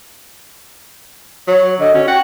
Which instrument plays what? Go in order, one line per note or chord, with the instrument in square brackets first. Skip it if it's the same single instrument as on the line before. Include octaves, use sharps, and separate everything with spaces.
[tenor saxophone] F#3 [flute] C#5
[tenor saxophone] D3 [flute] D#5
[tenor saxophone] C#4 [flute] F#4
[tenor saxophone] F#4 [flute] G5